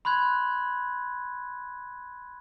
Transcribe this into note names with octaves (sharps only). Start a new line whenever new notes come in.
B5 C6 F#6 G#6